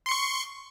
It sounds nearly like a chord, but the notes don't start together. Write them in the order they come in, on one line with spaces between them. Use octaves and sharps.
C6 C#7 C#6